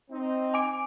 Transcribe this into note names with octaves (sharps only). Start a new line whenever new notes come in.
C4 D#4
G#5 D6 D7